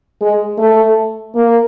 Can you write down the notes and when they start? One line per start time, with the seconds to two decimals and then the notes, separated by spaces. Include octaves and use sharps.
0.21 G#3
0.58 A3
1.35 A#3